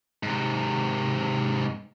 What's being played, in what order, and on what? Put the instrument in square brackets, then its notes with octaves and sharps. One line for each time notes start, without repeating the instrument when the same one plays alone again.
[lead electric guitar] G#2 C3